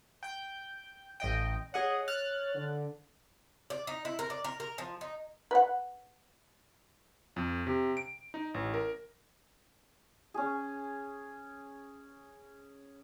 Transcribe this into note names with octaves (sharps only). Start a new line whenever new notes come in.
G5 G6
A1 D#5 G5
G#4 C#5 D#5 F#5
F6 F#6 A6
D3
D5
D#4
E4
A#4
D5
A#4
A#4
F3
D#4
B4 F#5
F2
C3
D7
D#4
A1
A#4
C#4 G#4